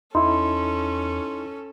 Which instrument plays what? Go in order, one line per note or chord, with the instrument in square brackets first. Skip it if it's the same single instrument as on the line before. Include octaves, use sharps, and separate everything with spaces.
[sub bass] E2 [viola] C#4 A4 [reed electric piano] D#4 E4 [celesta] C6